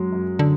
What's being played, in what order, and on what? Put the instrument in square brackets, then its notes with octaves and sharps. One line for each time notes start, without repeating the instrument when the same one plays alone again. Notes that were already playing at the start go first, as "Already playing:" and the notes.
Already playing: [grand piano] F#2 F#3 G#3
F#2
[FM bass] D3